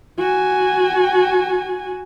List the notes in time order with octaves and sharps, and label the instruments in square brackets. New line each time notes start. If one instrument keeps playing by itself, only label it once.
[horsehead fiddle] F#4 G#5